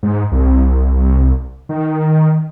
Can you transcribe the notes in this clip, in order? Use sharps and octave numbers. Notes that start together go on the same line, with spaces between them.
G#2
C2
D#3